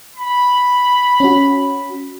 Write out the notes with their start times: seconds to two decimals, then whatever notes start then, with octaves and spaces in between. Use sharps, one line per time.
0.16 B5
1.20 C#4 F#4